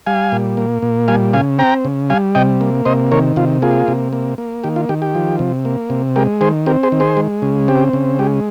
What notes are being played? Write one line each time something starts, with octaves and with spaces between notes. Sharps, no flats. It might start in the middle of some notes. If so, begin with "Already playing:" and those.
G3 F5 G#5
A#2
A#3
A#2
G3 F5 G#5
C#3 F5 G#5
C4 G5 A#5
C#3
G3 F5 G#5
C3 D#5 G5
A#3
C3 C5 D#5
D#3 A#4 C#5
C3 F4
A#3 F4 G#4
C3
A#3
A#3
D#3 G4
F4
D#3 G4
G4
F3
C3
A#3
C3
G#3 G4 A#4
D#3 G#4 C5
C4 G4 A#4
G#4 C5
D#3
G#4 C5
G#3
C#3
C4 G4
C#3
G#3 G4